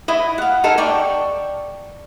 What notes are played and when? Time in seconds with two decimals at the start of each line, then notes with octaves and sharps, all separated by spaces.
0.08 E4 D#5
0.38 F5 F#5
0.64 D#4 A4 A#4 G#5
0.78 D5 G5 C#6